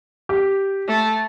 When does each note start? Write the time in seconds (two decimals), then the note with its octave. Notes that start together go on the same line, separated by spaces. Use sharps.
0.29 G4
0.88 A3